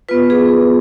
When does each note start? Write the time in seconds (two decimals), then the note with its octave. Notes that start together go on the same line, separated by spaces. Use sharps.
0.09 B3 F4 B4
0.30 G#4